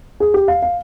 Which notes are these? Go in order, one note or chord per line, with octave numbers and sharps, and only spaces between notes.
G#4
G4
F5
F5